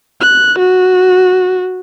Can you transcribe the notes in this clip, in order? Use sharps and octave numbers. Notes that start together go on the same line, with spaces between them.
F#6
F#4